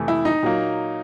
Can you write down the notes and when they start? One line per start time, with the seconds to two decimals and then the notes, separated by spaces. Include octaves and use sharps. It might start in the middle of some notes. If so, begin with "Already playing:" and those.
Already playing: F2 C3 E3 A3
0.08 E4
0.25 D#4
0.43 A#2 F#3 A#3